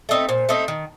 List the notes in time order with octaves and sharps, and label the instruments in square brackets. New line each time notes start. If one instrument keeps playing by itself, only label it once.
[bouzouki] A3 C4 D#4 [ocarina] D5
[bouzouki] A#2 [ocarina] C5
[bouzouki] A3 C4 D#4
D#3